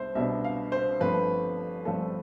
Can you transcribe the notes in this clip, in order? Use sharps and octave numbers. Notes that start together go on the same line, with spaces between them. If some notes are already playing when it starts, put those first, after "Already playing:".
Already playing: C2 B3 D4 C5 E5
C2 B2 B3 D4 E5
F5
C5
G1 G2 F3 A3 C4 B4
G1 G2 F3 A3 C4 A4